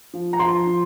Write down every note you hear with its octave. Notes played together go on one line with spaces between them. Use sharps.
F3
A#5
F3 C6
F3